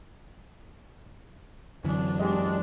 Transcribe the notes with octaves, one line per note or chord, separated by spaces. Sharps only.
F#2 D3 E3 D4
G#3 C#4 D4 G4 D#5